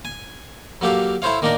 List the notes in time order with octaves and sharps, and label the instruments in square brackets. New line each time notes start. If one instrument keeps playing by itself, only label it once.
[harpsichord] G#5
F#3 A#3 G4 A4 F5
E4 A4 C5 C#5 F5
D#3 A#3 D4 D#4 A#4